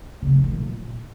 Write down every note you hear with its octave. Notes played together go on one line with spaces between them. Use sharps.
C#3
A3
D#3
A#2